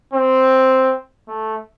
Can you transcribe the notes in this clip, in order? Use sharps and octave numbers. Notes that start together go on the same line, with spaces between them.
C4
A3